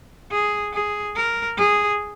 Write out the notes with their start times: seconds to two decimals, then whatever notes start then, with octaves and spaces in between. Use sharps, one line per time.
0.31 G#4
0.74 G#4
1.15 A#4
1.57 G#4